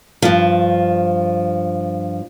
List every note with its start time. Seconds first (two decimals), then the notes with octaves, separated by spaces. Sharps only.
0.22 G2 F3